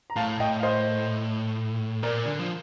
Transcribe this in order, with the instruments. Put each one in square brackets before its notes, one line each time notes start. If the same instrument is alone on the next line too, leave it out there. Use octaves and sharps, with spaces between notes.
[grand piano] A#5
[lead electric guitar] A2 [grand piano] F5 A5
[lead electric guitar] A2 [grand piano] D#5 G5
[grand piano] F5
C5 D#5
[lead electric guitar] A#2 [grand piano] A#4 D5
[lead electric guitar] D3
F3